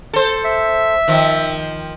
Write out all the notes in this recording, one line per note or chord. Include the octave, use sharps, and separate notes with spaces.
A4 C5
E5
D#3 F3